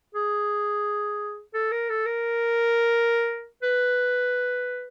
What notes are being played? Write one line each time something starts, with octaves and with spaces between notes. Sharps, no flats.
G#4
A4
A#4
A4
A#4
B4